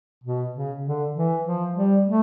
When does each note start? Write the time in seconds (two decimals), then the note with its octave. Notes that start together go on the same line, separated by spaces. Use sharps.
0.24 B2
0.54 C#3
0.84 D3
1.14 E3
1.44 F3
1.74 G3
2.04 A3